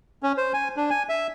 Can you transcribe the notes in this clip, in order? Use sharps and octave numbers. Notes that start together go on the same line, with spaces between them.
C#4
C5
G#5
D4
G#5
E5